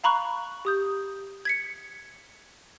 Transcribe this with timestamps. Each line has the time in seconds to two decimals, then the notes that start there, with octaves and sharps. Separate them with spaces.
0.04 F5 A#5 B5 C#6 F#6
0.65 G4 D#6 G6
1.45 G#6 B6 C#7